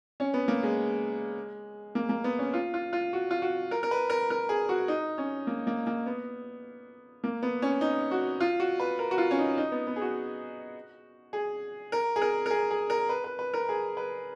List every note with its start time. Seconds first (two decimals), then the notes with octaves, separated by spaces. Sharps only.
0.20 C#4
0.34 B3
0.48 A#3
0.63 G#3
1.95 A#3
2.09 A#3
2.24 B3
2.39 C#4
2.54 F4
2.74 F4
2.93 F4
3.13 F#4
3.31 F4
3.42 F#4
3.71 A#4
3.83 A#4
3.91 B4
4.10 A#4
4.30 A#4
4.49 G#4
4.69 F#4
4.88 D#4
5.18 C#4
5.47 A#3
5.67 A#3
5.87 A#3
6.06 B3
7.24 A#3
7.42 B3
7.62 C#4
7.81 D#4
8.11 F#4
8.40 F4
8.60 F#4
8.80 B4
8.99 A#4
9.11 F#4
9.18 F4
9.31 C#4
9.39 D#4
9.58 D#4
9.72 B3
9.87 B3
9.96 G#4
10.02 F#4
11.33 G#4
11.92 A#4
12.16 G#4
12.22 A#4
12.46 A#4
12.50 G#4
12.71 G#4
12.90 A#4
13.09 B4
13.24 B4
13.39 B4
13.54 A#4
13.69 G#4
13.97 B4